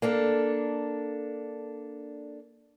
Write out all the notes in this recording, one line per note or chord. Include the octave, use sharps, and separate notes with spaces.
A#3 D4 A4